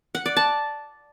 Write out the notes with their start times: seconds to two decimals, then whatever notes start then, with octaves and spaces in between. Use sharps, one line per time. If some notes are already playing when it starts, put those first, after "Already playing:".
0.15 F#5
0.26 D5
0.37 A5